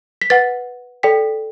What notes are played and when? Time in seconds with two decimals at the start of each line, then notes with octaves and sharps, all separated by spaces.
0.21 B6
0.30 B4 F#5 A6
1.03 A4 D5 G5 B6